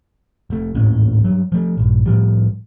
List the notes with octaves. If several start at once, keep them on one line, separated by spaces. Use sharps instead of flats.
F1 A3
G#1 D#2 A2 C#4
G2 F#3
F3 A3
A#1 G2
A2 F3 G3